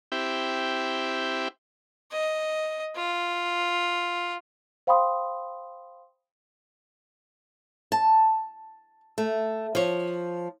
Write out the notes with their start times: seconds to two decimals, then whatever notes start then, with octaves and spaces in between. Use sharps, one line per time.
0.12 C4 E4 G4
2.12 D#5
2.96 F4
4.87 C5 F5 G5 B5 C6 D#6
7.92 A5
9.18 A3
9.75 F3 C#5